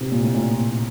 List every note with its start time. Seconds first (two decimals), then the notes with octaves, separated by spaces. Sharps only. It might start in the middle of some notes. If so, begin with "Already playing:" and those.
0.01 C3
0.12 A#2
0.23 A2
0.35 A#2